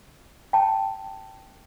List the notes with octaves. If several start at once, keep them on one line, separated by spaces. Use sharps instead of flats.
G5 A5